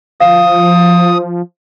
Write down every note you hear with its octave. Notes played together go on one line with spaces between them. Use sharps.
F3 F5 D#6